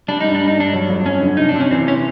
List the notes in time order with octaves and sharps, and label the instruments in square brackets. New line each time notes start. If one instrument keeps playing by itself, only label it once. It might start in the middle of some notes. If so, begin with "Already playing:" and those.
[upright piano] G3 [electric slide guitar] D4
[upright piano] G2 [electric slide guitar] D#4
[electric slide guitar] D4
[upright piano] G2
[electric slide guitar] D#4
[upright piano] G2 [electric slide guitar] D4
[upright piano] F#3
F2
[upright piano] F#3 [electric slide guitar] C#4
[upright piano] D3
[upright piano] C3 [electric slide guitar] D#4
[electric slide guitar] D4
[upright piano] C3
[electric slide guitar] C#4
[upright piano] E3 [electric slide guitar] C4
[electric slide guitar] C#4